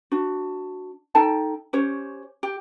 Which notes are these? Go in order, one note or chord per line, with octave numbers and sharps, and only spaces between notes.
D4 F#4
D#4 A4 G5 A5
C#4 G4 C5 C#5
G4